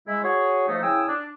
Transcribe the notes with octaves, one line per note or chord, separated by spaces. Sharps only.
G#3 E4
F#4 G#4 C#5
F3 A3 D#4
C#3 E4 G5 G#5 D#6 E6
D4